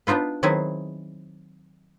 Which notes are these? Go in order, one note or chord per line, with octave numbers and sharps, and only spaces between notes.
B3 D4 D#4 F4 B4
D#3 F#3 B3 C4 E4 G#4